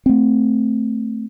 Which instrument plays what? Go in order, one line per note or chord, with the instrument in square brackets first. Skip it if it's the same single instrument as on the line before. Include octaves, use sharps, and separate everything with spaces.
[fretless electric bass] A3 C4